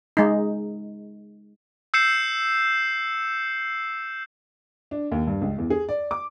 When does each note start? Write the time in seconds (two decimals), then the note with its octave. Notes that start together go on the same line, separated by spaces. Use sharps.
0.17 G#3 D#4
1.94 E6 G6 C7 C#7 E7
4.91 D4
5.12 D#2
5.27 G2
5.41 C#2
5.58 E2
5.70 G#4
5.89 D5
6.11 D6